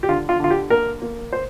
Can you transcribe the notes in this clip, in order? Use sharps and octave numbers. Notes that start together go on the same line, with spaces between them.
G4
D3 F4
F4
D3 F4
G4
A#3 A#4
A#3
C5